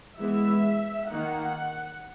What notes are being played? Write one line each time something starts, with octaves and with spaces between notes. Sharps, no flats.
E3 G#3 B3 E5
D#3 A#3 D#4 F#5